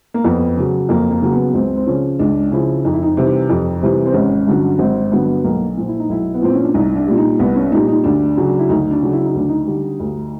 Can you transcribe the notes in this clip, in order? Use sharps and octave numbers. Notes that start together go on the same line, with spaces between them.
A#3
F2 B3
C#3 F#3
F2 A#3
A#3
C#3 F#3 A#3
B3
B3
C#2 C4
C4
C#3 F3 C#4
C#2 D4
C#3 F3 E4
F2 D#4
E4
D#4
C3 E3 G3
F2
C3 E3 G3
C4
G#1 C#4
G2 D3 F#3
G#1 C4
G2 D3 F#3 B3
B1 A#3
A#2 F3
E4
D#4
B1 E4
B3
A#2 F3 C4
C#4
D4
C2 D#4
D4
A#2 G3
D#4
C2 B3
C#4
A#2 G3 D#4
D#4
D2 D4
C#3 F#3
E4
D2 D#4
D4
C#3 F#3
E4
D#4
D2 D4
D#4
D3 G3
D2